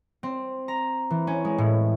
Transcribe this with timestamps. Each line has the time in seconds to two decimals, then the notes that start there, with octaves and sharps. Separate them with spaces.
0.23 C4
0.68 A#5
1.10 E3
1.27 C#4
1.45 G#3
1.58 A2